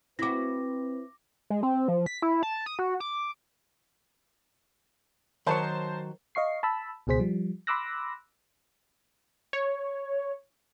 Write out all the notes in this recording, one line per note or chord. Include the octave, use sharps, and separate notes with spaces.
C4 E4 F#4 B4 D6 A#6
G#3
C4
F3
B6
E4
A5
D#6
F#4
D6
D#3 F#3 A#4 C5 C#5 A5
D#5 F5 C#6 C7
A5 B5 E6
C#2 B2 G#4 C5 B6
F3 G3
B5 C6 D6 E6 F#6 A#6
C#5